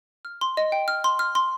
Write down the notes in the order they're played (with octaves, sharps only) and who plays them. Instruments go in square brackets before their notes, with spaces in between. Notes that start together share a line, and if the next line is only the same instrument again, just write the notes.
[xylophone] F6
C6
D#5
G5
F6
C6
F6
C6